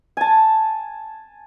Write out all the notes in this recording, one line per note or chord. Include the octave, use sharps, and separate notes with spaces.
G#5 A5